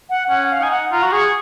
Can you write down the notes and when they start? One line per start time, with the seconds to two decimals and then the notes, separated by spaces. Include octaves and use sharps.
0.10 F#5
0.29 C#4 F#5
0.51 F5
0.61 D#4 G#5
0.71 F#5
0.92 F4 A#5
1.03 F#4
1.13 G#4 C#6